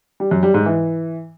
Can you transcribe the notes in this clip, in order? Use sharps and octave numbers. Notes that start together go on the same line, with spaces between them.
G3
F#2
G3
G#2
E3